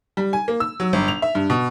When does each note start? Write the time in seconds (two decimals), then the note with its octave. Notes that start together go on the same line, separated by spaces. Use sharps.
0.17 G3
0.33 G#5
0.48 A#3
0.60 E6
0.80 F#3
0.93 G1
1.08 F7
1.22 E5
1.35 G2
1.50 B2